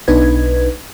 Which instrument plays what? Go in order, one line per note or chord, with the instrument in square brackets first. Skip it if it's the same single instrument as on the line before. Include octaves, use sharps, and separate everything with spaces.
[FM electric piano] B1 B3 D4 D#4 B4 G#6